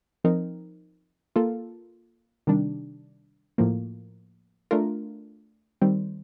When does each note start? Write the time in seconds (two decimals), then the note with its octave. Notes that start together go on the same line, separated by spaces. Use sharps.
0.24 F3 C4 D#4 A#4
1.36 A#3 F4 A4
2.47 C3 D#3 G3 D4
3.58 A2 F3 A#3
4.71 A3 D4 F4 A#4
5.81 D#3 G3 C4